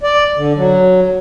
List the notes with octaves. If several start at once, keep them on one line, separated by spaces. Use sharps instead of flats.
D5
D3
F#3